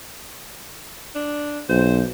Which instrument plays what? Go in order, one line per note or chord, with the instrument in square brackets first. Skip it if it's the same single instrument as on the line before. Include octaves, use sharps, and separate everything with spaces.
[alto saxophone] D4
[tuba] B1 [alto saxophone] C5